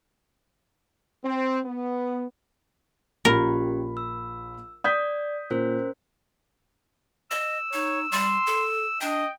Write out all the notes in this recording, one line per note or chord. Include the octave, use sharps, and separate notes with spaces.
C4
B3
A#1 C#4 F4 G4 A#4 B5
E6
D5 D#6 G6 B6
A#2 C#4 A#4 C5
D#5 E6
D#4 C#5
G3 C6
A4
D4 D#5 G5